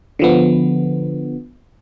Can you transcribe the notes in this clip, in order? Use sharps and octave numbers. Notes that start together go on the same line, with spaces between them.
D3 F3 B3